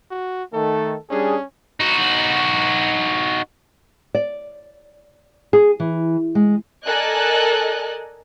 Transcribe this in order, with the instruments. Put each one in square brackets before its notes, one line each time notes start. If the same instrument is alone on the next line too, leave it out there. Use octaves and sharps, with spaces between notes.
[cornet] F#4
[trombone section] D#3 A3 [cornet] A4
[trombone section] G3 D4 G#4 [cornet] C#4
[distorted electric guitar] D#4 F#4
[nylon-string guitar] D5
G#4
E3
G#3
[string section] A4 A#4 D5 D#5 G#5 F#6